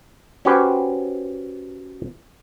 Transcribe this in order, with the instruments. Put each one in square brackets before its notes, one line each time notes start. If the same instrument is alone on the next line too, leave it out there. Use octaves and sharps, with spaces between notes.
[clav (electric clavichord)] C#4 F#4 G4 B4 C5